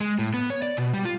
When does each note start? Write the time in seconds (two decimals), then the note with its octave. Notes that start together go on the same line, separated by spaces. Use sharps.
0.01 G#3
0.19 A2
0.34 B3
0.50 C#5
0.62 D5
0.77 B2
0.94 G3
1.05 F4